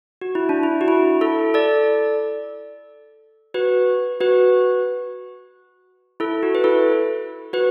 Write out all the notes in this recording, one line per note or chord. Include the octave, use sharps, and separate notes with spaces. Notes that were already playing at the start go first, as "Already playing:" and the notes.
F#4
E4
D4
E4
F#4
E4
E4 A4
A4 D5
F#4 B4
F#4 B4
E4 A4
F#4
B4
E4 A4
F#4 B4